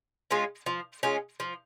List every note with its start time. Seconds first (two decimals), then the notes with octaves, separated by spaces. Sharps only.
0.31 G#3 C#4 F4
0.66 F3
1.03 G#3 C#4 F4
1.40 F3